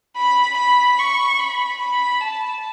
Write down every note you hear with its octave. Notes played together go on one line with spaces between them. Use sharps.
B5
B5
C#6
B5
B5
A5